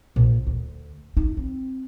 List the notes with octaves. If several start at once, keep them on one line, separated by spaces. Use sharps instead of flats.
A#1
D2
D#4
C4